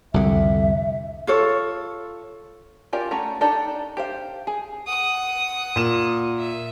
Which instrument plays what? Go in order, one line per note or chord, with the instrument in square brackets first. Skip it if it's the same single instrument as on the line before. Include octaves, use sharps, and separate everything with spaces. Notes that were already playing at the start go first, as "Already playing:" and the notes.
[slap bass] C2 F2 D3 [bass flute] E5
[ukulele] F4 A4 C#5
[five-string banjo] C#4 F4 G4 A#4 D5
A3 C#4 F#5 A#5
D4 D#4 G4 A4 D5
G4 C5 F5
G#4
[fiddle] F#5 D#6
[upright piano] A#2 E7
[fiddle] E5